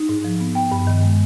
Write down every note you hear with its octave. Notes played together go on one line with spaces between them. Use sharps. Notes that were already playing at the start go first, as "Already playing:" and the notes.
Already playing: D#4
G#2
F3
B3
B3 G5
G2
D#3
G#3